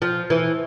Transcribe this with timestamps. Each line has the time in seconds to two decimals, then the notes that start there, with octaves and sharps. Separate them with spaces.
0.02 F3
0.30 E3